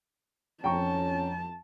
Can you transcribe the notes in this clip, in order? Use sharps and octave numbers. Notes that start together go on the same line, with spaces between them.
F2 C#4 G5 A5 A#5 C#6